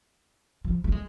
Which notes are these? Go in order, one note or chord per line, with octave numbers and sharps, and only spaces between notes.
F3
A3
G#3